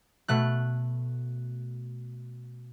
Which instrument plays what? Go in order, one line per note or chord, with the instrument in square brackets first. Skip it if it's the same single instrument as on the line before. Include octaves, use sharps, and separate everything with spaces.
[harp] B2 A3 F#6